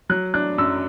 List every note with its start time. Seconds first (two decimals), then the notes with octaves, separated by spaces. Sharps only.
0.09 F#3 F#6
0.34 D4 F#6
0.58 F#2 E6